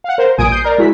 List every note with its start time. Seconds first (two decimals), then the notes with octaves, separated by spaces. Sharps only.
0.04 F5 F#5
0.18 A#4 C5
0.38 A#1 G2 A#2 G#5 D#6 D7
0.50 D#6 G6 C7
0.64 A#4 D5
0.78 G#3 E4 F#4 B6